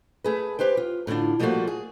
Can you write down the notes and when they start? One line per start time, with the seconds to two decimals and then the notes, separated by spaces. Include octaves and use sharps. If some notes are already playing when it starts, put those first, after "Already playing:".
0.24 A3 G#4 B4
0.59 G4 B4 C5 G5
0.77 F4
1.07 A2 D3 C4 D4 F4
1.39 F3 G3 A3 A#3 F4 F#4
1.67 G#4